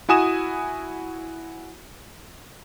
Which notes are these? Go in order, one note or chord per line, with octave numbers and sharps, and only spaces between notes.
E4 F#4 G#5 D#6 E7